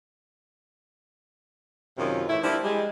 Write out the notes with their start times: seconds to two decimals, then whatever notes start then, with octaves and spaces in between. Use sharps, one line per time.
1.97 F#2 C3 D#3 C#4 F4
2.28 A2 E3 E4
2.42 F3 G3 A#3 D4 E4
2.62 G3 G#3